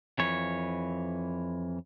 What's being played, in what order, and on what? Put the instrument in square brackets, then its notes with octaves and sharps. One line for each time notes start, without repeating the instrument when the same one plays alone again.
[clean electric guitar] F2 E3 C#5